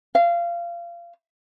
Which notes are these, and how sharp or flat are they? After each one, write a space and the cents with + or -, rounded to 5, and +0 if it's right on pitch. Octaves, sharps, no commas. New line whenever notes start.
F5 -25